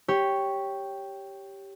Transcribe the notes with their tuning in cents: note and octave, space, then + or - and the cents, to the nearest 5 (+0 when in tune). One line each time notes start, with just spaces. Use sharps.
G4 +0 C#5 +0